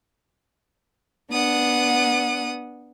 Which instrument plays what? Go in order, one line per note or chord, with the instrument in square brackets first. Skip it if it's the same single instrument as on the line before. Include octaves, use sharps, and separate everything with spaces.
[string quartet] B3 D4 F#5 D#6